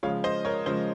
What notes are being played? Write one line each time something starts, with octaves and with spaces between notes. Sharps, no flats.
C#3 F3 G#3 C#5 F5
C5 D#5
A#4 C#5
C#3 F3 G#3 C5